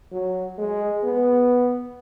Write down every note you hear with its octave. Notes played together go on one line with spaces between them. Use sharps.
F#3
G#3
B3